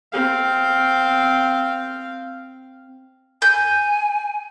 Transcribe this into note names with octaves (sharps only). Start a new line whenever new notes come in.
C4 F5
G#5 G6